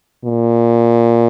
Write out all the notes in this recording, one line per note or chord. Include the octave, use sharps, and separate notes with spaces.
A#2